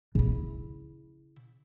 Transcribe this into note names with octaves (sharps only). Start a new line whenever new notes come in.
C#3 E4